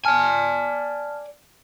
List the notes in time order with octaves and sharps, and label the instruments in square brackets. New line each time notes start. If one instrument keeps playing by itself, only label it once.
[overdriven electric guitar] D5 G#5 [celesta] A5 F6